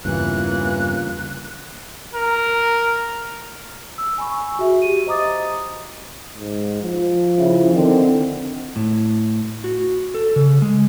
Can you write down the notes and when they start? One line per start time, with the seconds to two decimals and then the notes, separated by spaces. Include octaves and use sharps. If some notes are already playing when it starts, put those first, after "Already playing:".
0.05 E2 G2 C#3 E3 A#3 F4 F#6
2.14 A#4
3.98 E6
4.18 G#5 B5 C#6
4.59 F#4 G#4 E5
4.82 G4 D#7
5.06 C5 D#5 A#5 D6 D#6 A6
6.35 G#2
6.82 F3
7.38 C#3 E4
7.73 D3 D#3 C4
8.76 A2
9.64 F#4
10.15 A4
10.36 C#3
10.62 G#3